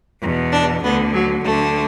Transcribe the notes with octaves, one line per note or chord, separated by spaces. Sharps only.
E2 B2 E4
D4
D2 D3 B3
F#3
D2 D3 A3